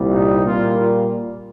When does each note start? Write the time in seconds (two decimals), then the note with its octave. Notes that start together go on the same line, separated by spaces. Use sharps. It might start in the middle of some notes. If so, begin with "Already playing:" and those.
Already playing: C2 A#2 G3
0.12 D#4
0.44 A#2 G3 A#3 F4